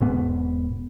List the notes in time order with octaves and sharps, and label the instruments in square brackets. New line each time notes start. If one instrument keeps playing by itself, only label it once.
[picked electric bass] E1 G#2 B3